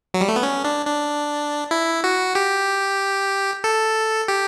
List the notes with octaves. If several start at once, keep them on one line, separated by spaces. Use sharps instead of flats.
F#3
G3
A3
B3
C#4
D4
D4
E4
F#4
G4
A4
G4